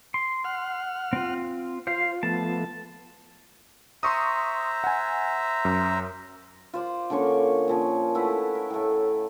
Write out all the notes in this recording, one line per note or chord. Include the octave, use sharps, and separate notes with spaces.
C6
F#5 F6
C4 F4
F4 C5 F5
F3 A3 B3 A5
C5 E5 A#5 C6 C#6 D#6
F#5 G#5
F#2
F4 C5 D5
D3 A#3 C#4 C#6
A#2 F3 C#4
A3 E4 B4 F#5
A#4
A2 A3